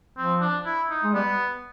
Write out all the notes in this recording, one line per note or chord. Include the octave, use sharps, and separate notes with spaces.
F3 C4
D4
E4
D#4
G#3
G3 B3